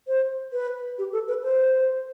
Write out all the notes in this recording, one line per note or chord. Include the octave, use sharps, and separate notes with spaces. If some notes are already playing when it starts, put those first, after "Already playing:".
C5
B4
G4
A4
B4
C5